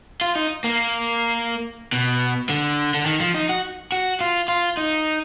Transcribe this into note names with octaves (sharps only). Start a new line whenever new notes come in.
F4
D#4
A#3
B2
D3
D3
D#3
F3
D#4
F#4
F#4
F4
F4
D#4